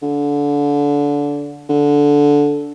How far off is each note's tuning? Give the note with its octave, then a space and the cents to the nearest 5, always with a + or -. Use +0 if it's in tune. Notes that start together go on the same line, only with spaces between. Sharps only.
D3 -25
D3 -10